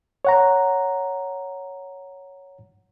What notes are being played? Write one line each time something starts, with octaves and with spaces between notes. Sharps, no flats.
C#5 F#5 A#5